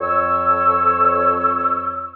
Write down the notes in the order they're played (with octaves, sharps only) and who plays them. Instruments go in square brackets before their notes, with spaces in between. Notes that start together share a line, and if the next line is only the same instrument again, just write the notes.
[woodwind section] F2 C#5 E6